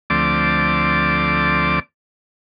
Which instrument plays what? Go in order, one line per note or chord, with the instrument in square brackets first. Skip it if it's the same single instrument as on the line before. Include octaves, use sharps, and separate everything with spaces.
[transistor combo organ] D2 F3 A3 C4 D5 D6